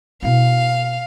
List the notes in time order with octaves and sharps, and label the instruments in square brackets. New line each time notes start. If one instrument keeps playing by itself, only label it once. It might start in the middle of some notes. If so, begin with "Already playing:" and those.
[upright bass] B2 E4 [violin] F5